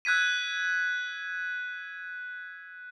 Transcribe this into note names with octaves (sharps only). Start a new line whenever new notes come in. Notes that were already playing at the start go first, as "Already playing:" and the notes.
E6 F#6 G#6 B6 D#7